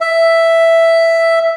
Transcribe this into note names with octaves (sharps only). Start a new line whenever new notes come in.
E5